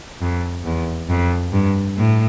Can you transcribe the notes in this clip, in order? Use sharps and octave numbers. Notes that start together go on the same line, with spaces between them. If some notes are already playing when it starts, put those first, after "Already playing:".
F2
E2
F2
G2
A2